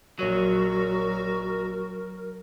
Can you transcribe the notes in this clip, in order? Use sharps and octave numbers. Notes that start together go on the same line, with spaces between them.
A#1 F#3 F#4 A#4 C#5 D#7